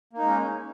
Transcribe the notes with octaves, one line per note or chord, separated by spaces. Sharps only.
G#3 A#3 C#4 D#4